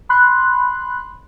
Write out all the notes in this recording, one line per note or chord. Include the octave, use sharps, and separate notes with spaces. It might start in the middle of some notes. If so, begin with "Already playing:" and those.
B5 C6 F#6